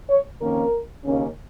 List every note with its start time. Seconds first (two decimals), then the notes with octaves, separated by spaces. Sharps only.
0.09 C#5
0.40 F2 D#3 A#3 C#4 A#4
1.04 D#2 C#3 A#3 C#4